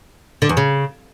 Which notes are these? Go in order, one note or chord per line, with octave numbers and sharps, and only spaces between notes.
D3
E2
C#3